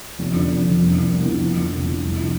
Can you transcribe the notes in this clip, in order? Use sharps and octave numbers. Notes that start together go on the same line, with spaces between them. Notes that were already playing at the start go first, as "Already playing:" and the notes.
F1
F2 D3 F3 D4
F1
F2 D3 F3 D4
C2
C3 F3 A#3 D4
C2
C3 F3 A#3 D4
F1
F2 D3
F1
F2 D3
C2
C3 F3 D4